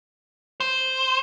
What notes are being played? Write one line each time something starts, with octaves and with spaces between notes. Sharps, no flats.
C5